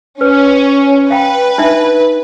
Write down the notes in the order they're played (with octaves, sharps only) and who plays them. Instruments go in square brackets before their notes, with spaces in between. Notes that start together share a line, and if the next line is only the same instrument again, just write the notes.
[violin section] C#4 [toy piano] B4
[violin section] B4 [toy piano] F5 G5 B5
[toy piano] D4 D#4 E5